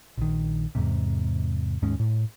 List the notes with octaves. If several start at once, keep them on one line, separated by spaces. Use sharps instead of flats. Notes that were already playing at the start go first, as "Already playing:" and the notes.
A#1 D#3
E2 G#2 C3
D#2 G#2 G#3 C#4
A2